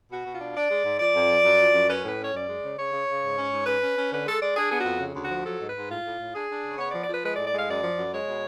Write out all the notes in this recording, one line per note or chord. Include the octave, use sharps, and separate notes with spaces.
B2 F#4
B2
F4
D4
D4 D5
G#3
G#2
F3 D5
F2
F3
F#2
F3
F#2
C#4 B4
A2 B4
C#4 C#5
F#2 D5
G#3
C#3
C#3 C#5
C#3
C#3
G#2
C#4
G#2
C#4 B4
C#4
C#4
D3 B4
G#3 A4
G#3 D5
D4 G#4
B3 G#4
F#4
F2
C#3
D2
F#4
F3
F#3 A4
G#2
B4
G#2
A2 F4
A2
A2
D4 G#4
D4
C#3
B3 C#5
D5
F3
D5
F3 B4
G#3 B4
D5
A2
D5
G#3 F5
F#2 D5
F3
F#2
G#3 C#5
B2